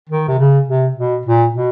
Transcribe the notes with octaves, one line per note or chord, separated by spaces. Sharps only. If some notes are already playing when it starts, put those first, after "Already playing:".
D#3
C3
C#3
C3
B2
A#2
B2